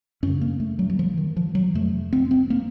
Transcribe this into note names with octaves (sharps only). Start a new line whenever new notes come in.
F#2 C#3 C#4
A#3
A3
F#3
F#3
F3
D#3
F3
F#3
F2 C3 A3
C4
C4
A#3